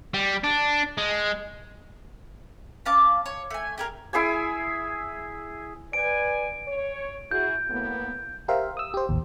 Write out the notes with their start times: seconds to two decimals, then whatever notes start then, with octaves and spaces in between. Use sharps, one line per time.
0.14 G3
0.44 D4
0.98 G#3
2.86 C#4 F5 A5 D6
3.26 C#5
3.51 A3 G#5
3.78 G4 G#4 A#4
4.13 E4 G#4 E5 G#5
5.93 B4 D5 G#5 D7
6.67 C#5
7.31 E4 F#4 G#4 G6
7.70 A2 A#3 B3
8.48 G4 A#4 C5 E5 F5
8.77 D#6 E6
8.94 G4 C5
9.09 A1 D#2